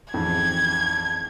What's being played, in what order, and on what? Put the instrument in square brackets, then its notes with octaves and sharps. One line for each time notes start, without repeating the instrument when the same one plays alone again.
[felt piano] A1 F2 G#2 [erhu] G#6